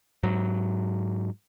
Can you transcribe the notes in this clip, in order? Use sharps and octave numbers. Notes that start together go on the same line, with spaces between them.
G#2 F#3